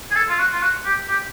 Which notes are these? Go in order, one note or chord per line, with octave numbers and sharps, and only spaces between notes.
G#4
A4
F4
F#4
F4
F#4
G4
G4